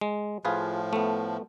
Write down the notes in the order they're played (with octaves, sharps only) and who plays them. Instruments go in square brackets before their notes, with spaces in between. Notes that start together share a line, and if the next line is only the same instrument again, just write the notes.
[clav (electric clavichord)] G#3
[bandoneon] A2 F3 [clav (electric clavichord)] F4 G#4 B4
[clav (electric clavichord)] A3 B3